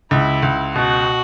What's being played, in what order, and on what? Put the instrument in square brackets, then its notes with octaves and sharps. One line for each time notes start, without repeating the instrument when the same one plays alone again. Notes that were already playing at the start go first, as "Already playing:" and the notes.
[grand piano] C#2 [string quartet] E4
[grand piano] C#2
[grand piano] B2 [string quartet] F#4